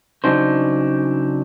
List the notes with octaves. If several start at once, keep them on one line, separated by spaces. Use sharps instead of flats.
C#3 F#3 D4 D#4 C5